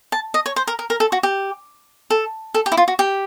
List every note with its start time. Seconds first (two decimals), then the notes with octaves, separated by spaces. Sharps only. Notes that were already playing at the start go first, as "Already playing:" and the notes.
0.12 A5
0.34 D#5
0.46 C#5
0.56 C5
0.67 A#4
0.79 A#4
0.90 A#4
1.00 A4
1.12 F#4
1.23 G4
2.10 A4
2.54 A4
2.66 G4
2.72 E4
2.77 F4
2.88 F#4
2.99 G4